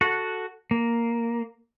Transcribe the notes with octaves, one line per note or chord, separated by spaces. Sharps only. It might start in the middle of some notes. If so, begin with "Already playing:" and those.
F#4 A4 F#5
A#3